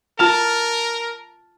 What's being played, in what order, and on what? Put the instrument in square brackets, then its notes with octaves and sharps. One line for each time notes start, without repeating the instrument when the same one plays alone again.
[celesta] F4 F6 F7 [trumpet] A#4 [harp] A5